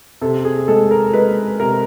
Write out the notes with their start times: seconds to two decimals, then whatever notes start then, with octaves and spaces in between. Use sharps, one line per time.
0.22 C3 A4
0.45 G#4
0.68 G#3 A4
0.91 A#4
1.13 G#3 B4
1.60 C3 A#4